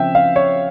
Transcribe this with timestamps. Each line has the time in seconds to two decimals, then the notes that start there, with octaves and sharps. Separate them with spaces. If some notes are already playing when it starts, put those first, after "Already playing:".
Already playing: C#3 F3 C4 E5 G5
0.15 F5
0.36 C#5